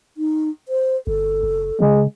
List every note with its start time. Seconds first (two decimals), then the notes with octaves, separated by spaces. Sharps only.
0.17 D#4
0.68 C5
1.07 G1 A4
1.43 F#1
1.80 C#3 G#3